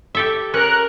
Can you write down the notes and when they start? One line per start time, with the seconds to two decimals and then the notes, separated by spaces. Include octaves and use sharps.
0.15 G4 A4 E5
0.54 C#4 A#4 F#6